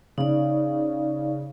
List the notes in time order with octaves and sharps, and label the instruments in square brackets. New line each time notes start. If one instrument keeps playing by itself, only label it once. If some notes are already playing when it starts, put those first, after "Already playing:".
[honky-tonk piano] C#3 [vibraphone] D#4 D5